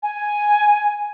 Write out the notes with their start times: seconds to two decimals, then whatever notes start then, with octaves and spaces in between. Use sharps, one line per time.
0.03 G#5